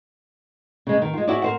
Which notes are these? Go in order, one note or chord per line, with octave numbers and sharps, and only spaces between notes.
C#3 G#3
D#3
G#3 F4
E4 F#4 G#4 C#5 D5
A#4 C5 F#5